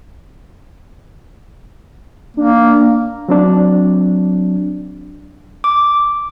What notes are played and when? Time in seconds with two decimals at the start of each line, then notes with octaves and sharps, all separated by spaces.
2.37 A#3 D4
3.29 F#3 C4 D4
5.64 D6